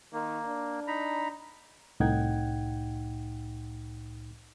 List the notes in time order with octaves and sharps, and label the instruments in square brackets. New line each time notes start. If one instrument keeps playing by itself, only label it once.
[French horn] D#3 [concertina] A#3
[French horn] D4
[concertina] D#4 A#5 B5
[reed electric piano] C2 A2 D#4 F#5 G5 G#6